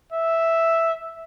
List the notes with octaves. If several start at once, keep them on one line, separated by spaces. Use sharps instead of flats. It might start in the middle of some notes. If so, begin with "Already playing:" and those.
E5